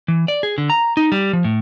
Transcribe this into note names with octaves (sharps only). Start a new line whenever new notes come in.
E3
D5
G#4
D3
A#5
D#4
G3
F3
A2